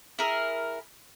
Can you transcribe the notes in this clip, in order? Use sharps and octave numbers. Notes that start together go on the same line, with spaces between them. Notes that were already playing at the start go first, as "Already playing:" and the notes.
E4 G#4 A#4